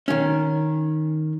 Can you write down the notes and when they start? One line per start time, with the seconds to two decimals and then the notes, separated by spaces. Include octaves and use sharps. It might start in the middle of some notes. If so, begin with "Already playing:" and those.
0.08 D#3 C#4